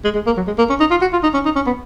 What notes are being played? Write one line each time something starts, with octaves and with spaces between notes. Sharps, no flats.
G#3
G#3
A#3
F#3
G#3
A#3
C#4
D#4
F4
F#4
F4
D#4
C#4
D#4
C#4
B3